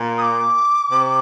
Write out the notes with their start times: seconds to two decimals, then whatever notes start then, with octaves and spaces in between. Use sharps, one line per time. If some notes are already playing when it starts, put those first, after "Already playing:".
Already playing: A#2
0.18 D#6
0.22 D6
0.91 C3